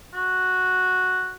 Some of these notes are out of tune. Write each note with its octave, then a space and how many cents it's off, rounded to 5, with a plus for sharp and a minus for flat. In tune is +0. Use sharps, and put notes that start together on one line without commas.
F#4 -5